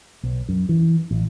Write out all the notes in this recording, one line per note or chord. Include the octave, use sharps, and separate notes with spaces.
B1
F#2
E3
A1